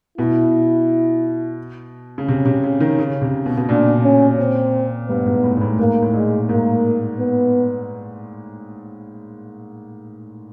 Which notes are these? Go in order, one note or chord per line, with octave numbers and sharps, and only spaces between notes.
B2 E4
C#3
C3 C#4
C3
C#3
D#3
C#3
C3
B2
B2
A#2 D4
C#4
C4
G2 B3
G#2
A2
G#2
A2
G#2 A#3
A2
A#2 G#3
G#2 A#3
B3